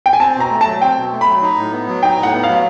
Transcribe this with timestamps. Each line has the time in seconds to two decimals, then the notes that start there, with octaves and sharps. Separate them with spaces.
0.06 G5
0.13 G#5
0.20 C4 A5
0.36 B2 A#5
0.51 A3
0.61 F#3 A5
0.81 C4 G5
0.96 B2
1.12 A3
1.21 B5
1.27 F#3
1.42 D#4
1.57 A2
1.72 B3
1.88 F#3
2.03 D#4 G5
2.18 A2 F#5
2.33 B3
2.43 F5
2.48 F#3
2.54 F5